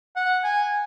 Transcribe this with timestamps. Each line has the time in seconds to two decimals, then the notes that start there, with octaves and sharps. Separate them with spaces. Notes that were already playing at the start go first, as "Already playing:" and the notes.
0.16 F#5
0.44 G#5